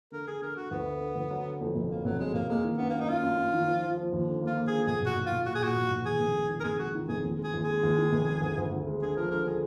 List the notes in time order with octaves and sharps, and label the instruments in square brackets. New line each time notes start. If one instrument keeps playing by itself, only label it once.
[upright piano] D3 [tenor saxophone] A#4
[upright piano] D3 [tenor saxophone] G#4
[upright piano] D3 [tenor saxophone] A#4
[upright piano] D3 [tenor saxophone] F#4
[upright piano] D2 [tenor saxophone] B3
[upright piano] D3
D3
D2
F#3
D3
F2
F1
[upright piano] F#3 [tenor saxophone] A#3
[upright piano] F1 [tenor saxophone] F#3
[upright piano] F#3 [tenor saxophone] G#3
[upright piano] F1 [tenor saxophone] A#3
[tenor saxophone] G#3 [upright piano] A#3
[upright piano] D#3
[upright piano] F#2 [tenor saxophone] B3
[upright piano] F#2 [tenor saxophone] A#3
[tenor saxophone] D#4
[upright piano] F#2 [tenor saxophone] F4
[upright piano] F#2
F#2
D#3
F3
F3
F3
D#2
D3
A#3
[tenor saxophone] F4
[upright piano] A#3
[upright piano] D3 [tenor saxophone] G#4
[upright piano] B1 [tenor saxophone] G#4
[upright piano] B1 [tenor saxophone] F#4
[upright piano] B1
[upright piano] B1 [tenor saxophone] F4
[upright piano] A#2 [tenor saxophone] F#4
[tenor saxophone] G#4
[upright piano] A#2 [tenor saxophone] F#4
[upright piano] B1
B1
[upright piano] D#2 [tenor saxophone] G#4
[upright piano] F1
G#3
D#3
[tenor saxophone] A#4
[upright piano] F1 [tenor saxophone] G#4
[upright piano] G#3 [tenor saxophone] F#4
[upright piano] D#3
[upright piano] F1 [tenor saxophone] G#4
[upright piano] D#2
G#3
[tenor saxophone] G#4
[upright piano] D#2
[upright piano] G#3 [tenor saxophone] G#4
[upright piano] D#2
D#3
F1
G#3
D2
D2
D2
G#3
[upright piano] D3 [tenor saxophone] G#4
[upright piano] F3 [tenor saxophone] A#4
[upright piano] D3 [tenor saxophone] A#4
[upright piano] D3 [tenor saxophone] G#4